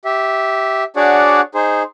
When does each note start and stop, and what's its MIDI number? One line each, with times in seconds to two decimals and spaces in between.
0.05 0.84 67
0.05 0.84 76
0.96 1.41 62
0.96 1.41 66
0.96 1.41 68
0.96 1.41 73
0.96 1.41 74
0.96 1.41 78
1.55 1.83 63
1.55 1.83 68
1.55 1.83 72